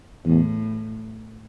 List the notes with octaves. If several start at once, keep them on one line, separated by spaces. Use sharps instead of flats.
E2 A2